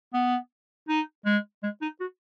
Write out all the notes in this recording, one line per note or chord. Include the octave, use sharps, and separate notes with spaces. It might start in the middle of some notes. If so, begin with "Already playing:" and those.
B3
D#4
G#3
G#3
D#4
F#4